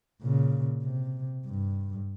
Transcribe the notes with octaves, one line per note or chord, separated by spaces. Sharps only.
A#2 C#3
C3
G2